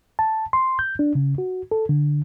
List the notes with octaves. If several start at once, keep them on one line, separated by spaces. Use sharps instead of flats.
A5
C6
G6
D4
C#3
F#4
A4
D3